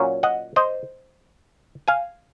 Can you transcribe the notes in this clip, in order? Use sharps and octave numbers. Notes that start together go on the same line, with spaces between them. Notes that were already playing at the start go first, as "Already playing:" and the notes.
Already playing: A#2 F#3 C#4
D#5 F#5
C5 D#5
F5 G#5